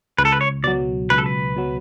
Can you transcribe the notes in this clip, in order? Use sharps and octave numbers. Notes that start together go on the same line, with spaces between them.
C#2 B4
A4
B4
C#5
B2 F#3 D5
C#2 B4
A4
B4
B2 F#3